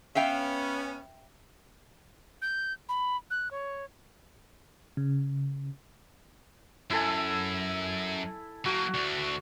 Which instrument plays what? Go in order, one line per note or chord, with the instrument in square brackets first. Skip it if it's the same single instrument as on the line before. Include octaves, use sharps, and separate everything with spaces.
[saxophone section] B3 C#4 [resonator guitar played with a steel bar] E5 F5 G5
[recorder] G6
B5
F#6
C#5
[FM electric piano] C#3
[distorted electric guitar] F#2 [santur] E4 A4 G#5
[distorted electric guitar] F#3 A#3 [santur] F#4
[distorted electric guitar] D2 D3